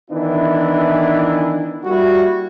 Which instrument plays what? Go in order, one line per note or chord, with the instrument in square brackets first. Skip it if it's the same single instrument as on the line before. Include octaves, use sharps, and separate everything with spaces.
[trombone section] D#3 E3 B3 D4 E4
G3 A#3 E4 F#4